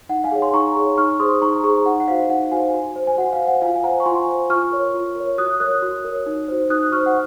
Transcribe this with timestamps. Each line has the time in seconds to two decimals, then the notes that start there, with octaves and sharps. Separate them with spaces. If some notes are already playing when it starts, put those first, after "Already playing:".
0.09 D#4 F#5
0.24 F5 G#5
0.32 G#4 C#5
0.42 C6
0.53 D#4 A#5 C#6
0.76 G#4 C#5
0.98 D#4 C#6 F6
1.19 G#4 C5 C6 D#6
1.41 D#4 A#5 C#6
1.64 G#4 C5 A#5 C#6
1.85 D#4 F#5
2.00 F#5
2.08 F#4 C5 F5
2.30 D#4 F#5
2.52 F#4 C5 F5 G#5
2.74 F#4
2.96 C5
3.07 G#5
3.18 F#4 F#5
3.33 F5
3.40 C5
3.47 F#5
3.62 F4 F5 G#5
3.75 G#5
3.84 C5 F#5 A#5
4.00 C#6
4.06 F4 G#5 C6
4.28 C5
4.50 F4 C#6 F6
4.72 A#4 C#5
4.94 F4
5.16 A#4 C#5
5.38 F#4 D#6 F#6
5.60 A#4 C#5 D#6 F#6
5.82 F#4
6.05 A#4 C#5
6.26 D#4
6.48 F#4 C5
6.70 D#4 D#6 F#6
6.92 F#4 C5 C#6 F6
7.06 F#5